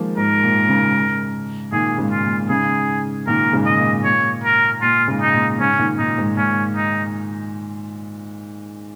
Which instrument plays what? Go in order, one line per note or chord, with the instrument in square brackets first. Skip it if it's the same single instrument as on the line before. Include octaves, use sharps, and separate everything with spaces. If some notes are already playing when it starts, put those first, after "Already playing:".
Already playing: [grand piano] D#3 F3 G#3 A#3
[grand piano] G#2 [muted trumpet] A#4
[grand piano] A#2
G#2 C#3
[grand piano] A#2 D#3 [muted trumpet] G#4
[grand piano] G#2 C#3
[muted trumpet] F4
[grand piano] A#2
[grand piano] G#2 C#3 [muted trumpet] G#4
[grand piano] A#2 D#3 [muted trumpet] A#4
[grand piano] G#2 C#3
[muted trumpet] D#5
[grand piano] A#2
[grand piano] A#2 [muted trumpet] C#5
[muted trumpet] A#4
[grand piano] A#2 [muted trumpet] F4
[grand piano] G#2 C#3
[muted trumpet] D#4
[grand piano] A#2
[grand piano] G#2 C#3 [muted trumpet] C#4
[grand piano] A#2 D#3
[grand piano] A#2 [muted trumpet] D#4
[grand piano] G#2
[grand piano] A#2 [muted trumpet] C#4
[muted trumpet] D#4